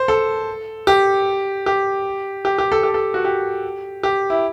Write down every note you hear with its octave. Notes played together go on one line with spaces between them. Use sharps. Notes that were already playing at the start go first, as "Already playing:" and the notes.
Already playing: C5
A4
G4
G4
G4
G4
A4
G4
A4
F#4
G4
G4
E4